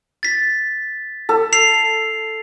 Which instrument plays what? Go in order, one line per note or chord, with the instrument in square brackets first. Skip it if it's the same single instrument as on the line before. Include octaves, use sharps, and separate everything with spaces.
[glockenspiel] A6 B6
[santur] A4
[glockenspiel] C7 F7